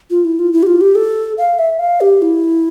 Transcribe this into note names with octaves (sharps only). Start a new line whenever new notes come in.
F4
E4
F4
E4
G4
F4
G4
A4
F5
E5
F5
G4
E4